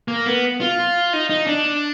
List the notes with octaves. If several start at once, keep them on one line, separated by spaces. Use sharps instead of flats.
A#3
B3
F4
D#4
D#4
D4